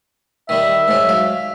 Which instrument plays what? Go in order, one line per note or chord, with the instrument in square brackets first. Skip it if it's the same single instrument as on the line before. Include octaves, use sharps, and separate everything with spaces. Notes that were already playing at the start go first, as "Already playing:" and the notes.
[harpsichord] D#3 G3 [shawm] E5
[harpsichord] G#2 F#3
F5